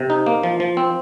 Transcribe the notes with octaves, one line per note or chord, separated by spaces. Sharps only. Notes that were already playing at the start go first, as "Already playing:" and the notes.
Already playing: C3
D#4
A#3
F3
F3
C4